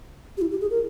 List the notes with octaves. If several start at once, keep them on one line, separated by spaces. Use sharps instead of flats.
G4
E4
G4
G#4
A#4